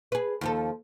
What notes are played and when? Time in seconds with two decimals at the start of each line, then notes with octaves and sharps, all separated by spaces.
0.12 G#4 B4
0.41 D#2 F3 A4